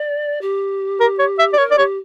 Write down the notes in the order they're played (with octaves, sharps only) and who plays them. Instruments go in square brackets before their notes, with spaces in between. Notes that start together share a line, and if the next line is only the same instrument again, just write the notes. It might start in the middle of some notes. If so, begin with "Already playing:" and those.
Already playing: [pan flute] D5
G4
[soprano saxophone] A#4
C#5
E5
D5
[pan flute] A#4 [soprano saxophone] C#5
[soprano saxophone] D5
[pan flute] G4 [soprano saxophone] C#5